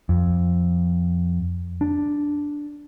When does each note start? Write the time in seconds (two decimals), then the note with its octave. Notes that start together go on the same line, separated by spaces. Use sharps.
0.09 F2
1.81 D4